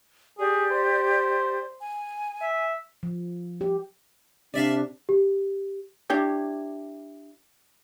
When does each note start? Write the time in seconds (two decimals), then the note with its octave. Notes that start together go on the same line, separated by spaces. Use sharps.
0.38 G4 G#4 D5
0.71 C5
1.78 G#5
2.41 E5
3.03 F3
3.61 G4
4.54 C3 D4 D5 E5 F5
5.09 G4
6.10 D4 E4 G4 C#5